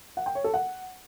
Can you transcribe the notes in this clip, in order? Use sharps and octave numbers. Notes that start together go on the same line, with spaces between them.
F#5
G5
C#5
A4
F#5